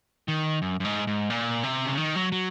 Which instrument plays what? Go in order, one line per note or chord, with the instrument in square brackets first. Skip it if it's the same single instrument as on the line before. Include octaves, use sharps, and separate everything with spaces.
[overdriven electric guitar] D#3
F#2
F#2
G#2
G#2
A#2
C3
C#3
D#3
F#3
F#3